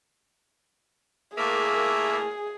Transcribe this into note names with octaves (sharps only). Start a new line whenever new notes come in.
A2 A#3 G#4 E5